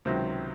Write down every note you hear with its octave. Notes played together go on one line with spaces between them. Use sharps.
C#2 C3 D#3 F#3 C5